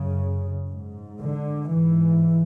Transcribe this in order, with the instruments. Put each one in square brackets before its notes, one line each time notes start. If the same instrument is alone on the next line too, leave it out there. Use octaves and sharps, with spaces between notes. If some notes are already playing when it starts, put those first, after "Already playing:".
Already playing: [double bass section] F#2 C#3
G#2
D3
G#2 E3